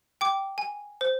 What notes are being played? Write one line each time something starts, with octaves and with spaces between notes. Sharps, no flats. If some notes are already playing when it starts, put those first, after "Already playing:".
G5 D6
G#5
C5